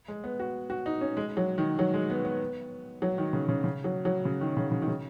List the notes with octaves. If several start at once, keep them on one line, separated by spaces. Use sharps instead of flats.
G#3
B3
F#4
F#4
D#4
C#4
G#3
F#3
D#3
F#3
G#3
B3
B3
F#3
D#3
C#3
C#3
C#3
F#3
F#3
C#3
D#3
C#3
C#3
D#3
C#3